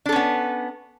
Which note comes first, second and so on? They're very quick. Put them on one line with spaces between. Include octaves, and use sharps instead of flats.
D4 A4 C#4 B3